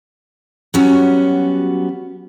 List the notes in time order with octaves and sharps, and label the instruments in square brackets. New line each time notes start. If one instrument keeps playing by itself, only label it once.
[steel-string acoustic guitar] F#3 G3 B3 C#4 F#4